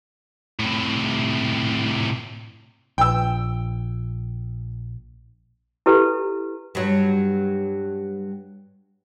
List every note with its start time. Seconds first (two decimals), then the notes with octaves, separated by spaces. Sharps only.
0.59 A2 C3
2.98 A#1 G5 E6
5.86 E4 G4 A4 B4
6.75 G2 F#3